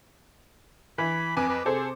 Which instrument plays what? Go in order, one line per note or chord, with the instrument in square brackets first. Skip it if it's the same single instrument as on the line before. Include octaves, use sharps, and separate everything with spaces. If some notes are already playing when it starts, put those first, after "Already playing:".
[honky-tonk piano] E3 [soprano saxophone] B5
[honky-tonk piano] F2 G#5 D6 [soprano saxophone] B4
[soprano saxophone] B4
[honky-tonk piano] C3 A4 C5 [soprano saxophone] G#4